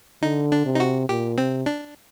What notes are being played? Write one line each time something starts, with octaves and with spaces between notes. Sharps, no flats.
D3 D#4
D4
C3
D#4
F#4
A#2 G4
C3 C4
D4